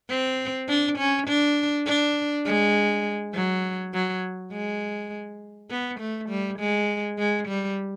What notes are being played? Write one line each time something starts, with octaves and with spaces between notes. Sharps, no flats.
C4
D4
C#4
D4
D4
G#3
F#3
F#3
G#3
B3
A3
G3
G#3
G#3
G3